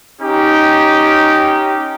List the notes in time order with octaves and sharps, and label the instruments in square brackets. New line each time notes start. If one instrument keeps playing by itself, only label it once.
[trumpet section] C#4 D#4 G4